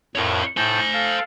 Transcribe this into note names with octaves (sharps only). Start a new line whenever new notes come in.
F2 A2 A#4 C#5
A2 C5 G#5 A5 G6
A4 F5